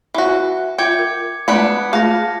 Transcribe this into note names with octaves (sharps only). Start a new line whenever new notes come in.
E3 F#4
F4 E5 G5 D6 G#6 C#7
A#4
G#3 A3 B3 D4 B5 C#7
A3 F4 G#4 F5 A5 A#6